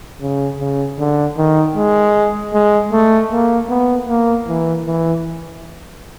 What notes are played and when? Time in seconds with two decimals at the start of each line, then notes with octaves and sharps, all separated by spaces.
0.21 C#3
0.60 C#3
0.99 D3
1.37 D#3
1.76 G#3
2.54 G#3
2.93 A3
3.32 A#3
3.70 B3
4.09 A#3
4.48 E3
4.86 E3